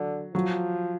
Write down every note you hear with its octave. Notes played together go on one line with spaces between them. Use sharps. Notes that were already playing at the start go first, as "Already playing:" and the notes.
Already playing: D3 F#3
F3 F#3